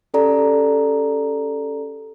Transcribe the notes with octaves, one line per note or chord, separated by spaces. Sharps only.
C#4 G4 A4 D5 A#5